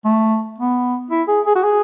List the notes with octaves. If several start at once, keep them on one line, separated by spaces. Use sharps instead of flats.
A3
B3
E4
G#4
G#4
F#4
G#4